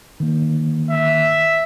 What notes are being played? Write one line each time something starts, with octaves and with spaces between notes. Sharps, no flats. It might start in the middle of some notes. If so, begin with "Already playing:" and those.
D#3 A#3
E5